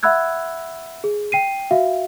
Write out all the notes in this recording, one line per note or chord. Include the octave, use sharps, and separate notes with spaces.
E5 F#5 B5 E6 F#6 G#6
G#4
G5 C7 D#7
F#4 E5 F5